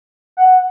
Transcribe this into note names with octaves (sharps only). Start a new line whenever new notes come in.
F#5